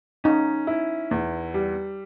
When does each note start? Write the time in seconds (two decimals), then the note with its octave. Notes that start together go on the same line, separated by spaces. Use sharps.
0.24 C#4 D#4
0.67 E4
1.11 E2
1.54 G3